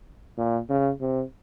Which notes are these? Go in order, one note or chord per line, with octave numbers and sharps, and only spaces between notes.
A#2
C#3
C3